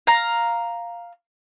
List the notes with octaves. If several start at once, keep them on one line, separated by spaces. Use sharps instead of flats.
F5 A#5